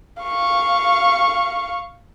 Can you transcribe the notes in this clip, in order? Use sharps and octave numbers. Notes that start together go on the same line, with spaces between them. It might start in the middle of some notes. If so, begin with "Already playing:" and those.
F5 C#6